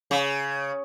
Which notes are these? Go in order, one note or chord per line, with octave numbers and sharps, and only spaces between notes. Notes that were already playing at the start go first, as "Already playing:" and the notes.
C#3